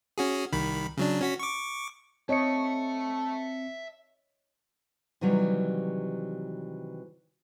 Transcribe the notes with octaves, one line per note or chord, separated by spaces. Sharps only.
C#4 F#4 G#4
C2 D#3 B5
C#3 F#3 D4
C#4 F#4 B6
C#6 D6
C4 C#5 D#5 E5 A5 C#7
C3 D#3 E3 F#3 G3